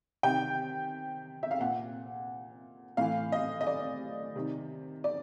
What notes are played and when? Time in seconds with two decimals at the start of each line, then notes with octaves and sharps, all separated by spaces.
0.23 C3 D#3 G5
1.43 E5
1.51 F5
1.60 A#2 F#5
2.97 A2 E3 F5
3.32 D#5
3.61 D#5
3.67 D5
4.36 C3 D#3
5.04 D5